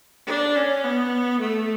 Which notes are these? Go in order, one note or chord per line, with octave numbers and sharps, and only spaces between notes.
D4
C#4
B3
A3